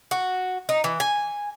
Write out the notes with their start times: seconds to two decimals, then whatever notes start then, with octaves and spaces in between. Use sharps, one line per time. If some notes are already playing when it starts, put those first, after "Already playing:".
0.11 F#4
0.69 D#4
0.84 E3
1.00 G#5